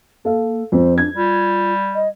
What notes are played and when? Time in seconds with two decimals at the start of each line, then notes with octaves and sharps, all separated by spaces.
0.25 A#3 A4 F5
0.72 F2 C5
0.98 D4 G#6
1.16 G3 F4
1.95 D#5